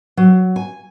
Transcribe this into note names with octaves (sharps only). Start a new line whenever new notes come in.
F#3
G#5